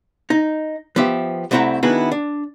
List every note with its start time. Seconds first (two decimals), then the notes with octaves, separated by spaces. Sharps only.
0.30 D#4
0.96 F3 B3 G4 E5
1.51 C2 A3 C4 E4 F#5 A#5
1.83 D#3 B3 D4 E4 F#4 G#4
2.11 D4